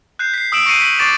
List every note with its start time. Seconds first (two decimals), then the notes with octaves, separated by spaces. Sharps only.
0.19 F#6 G6 C7
0.34 B6 C7
0.52 D#6 E6 B6 D7 E7 F#7
0.66 C#6 A#6 C7 C#7 D#7 F#7
0.82 B6 F#7
0.99 C#6 D6 A6 C7 D7 E7